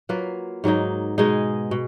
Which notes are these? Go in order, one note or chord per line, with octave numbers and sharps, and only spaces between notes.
F#3 A#3 F4 B4
G#2 F#3 A#3 D#4
B2 G#3 D#4 G#4
B2